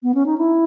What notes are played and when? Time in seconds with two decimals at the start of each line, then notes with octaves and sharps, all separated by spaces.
0.03 B3
0.14 C#4
0.26 D#4
0.38 E4